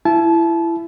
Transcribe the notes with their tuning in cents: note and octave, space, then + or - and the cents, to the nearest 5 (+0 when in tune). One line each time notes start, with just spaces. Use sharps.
E4 +20 A5 -25